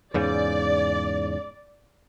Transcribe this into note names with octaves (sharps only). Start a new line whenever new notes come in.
E2 G#2 C#3 D5